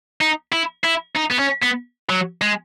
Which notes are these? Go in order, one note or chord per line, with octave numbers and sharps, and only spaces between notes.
D#4
E4
E4
D#4
B3
C#4
B3
F#3
G#3